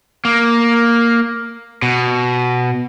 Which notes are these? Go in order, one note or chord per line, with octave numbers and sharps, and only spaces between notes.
A#3
B2